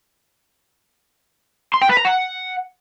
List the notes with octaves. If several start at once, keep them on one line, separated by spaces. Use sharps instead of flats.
C6
G5
B4
A#5
F#5